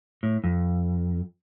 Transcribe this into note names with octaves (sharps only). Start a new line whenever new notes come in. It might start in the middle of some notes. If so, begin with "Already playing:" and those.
A2
F2